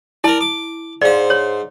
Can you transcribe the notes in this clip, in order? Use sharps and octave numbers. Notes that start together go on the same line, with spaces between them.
E4 A#4 D5 A5
D6
G#2 C5 D5 F5
C#5